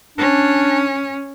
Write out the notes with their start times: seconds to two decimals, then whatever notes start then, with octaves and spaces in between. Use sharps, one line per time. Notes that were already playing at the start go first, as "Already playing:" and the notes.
0.18 C#4 D4